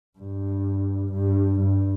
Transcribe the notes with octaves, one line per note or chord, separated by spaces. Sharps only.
G2
G2
G2